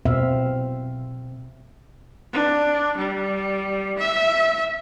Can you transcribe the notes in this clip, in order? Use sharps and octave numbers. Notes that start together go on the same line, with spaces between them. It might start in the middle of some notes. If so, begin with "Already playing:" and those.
B2 C4 E5 F5
D4
G3
E5